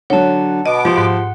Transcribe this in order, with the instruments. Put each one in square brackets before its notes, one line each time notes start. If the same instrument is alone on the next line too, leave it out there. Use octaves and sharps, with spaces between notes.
[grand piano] D3 F#3 [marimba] C#5 [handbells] F#5 A5
[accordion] B2 B3 D6 [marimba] D#5
[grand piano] F3 [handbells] F4 G4 C6
[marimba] G#2 [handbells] F#5